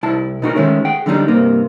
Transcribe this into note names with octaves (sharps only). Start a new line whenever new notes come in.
C2 E4 A5
B2 D#4 F#4 A#4
D#3 G#3 A3 C#4
G#4 F#5 G5
D3 F#3 G3 C#4 D#4
G2 C3 A#3